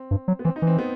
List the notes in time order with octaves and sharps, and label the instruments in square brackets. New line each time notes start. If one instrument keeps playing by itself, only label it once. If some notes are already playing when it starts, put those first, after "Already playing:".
Already playing: [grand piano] C4
[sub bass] G2
F#3
[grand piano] B3
[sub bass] E3 [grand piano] C4
[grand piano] D#4
[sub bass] E3
[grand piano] C4
B3